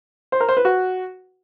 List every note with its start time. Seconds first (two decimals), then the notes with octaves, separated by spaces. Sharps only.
0.32 C5
0.40 A#4
0.49 C5
0.57 B4
0.65 F#4